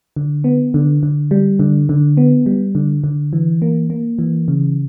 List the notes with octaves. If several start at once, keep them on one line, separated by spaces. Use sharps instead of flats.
D3
B3
D3
D3
G3
D3
D3
B3
G3
D3
D3
E3
A#3
A#3
E3
C#3